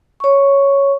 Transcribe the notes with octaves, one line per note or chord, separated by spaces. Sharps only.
C#5 C#6